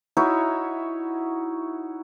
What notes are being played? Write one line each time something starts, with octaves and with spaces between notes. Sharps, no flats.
D#4 E4 F#4 C#5